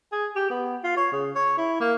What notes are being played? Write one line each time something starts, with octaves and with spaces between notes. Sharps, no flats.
G#4
G4
B3
F4
C#5
C#3
C#5
E4
A#3